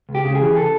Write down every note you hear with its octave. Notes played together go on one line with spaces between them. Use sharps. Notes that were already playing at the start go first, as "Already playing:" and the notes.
C#2
G4
C#3
G#4
E3
A4